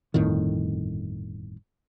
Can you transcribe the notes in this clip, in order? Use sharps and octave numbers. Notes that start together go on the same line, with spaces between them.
G1 F2 A2 D#3